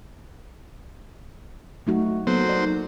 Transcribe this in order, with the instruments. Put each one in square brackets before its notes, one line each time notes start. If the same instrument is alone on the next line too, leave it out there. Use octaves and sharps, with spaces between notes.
[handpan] F#3 D#4 F#4 [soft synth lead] A3
[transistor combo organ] F#3 C5 [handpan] A#3 A4 [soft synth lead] B3
[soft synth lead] D#4 [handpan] D5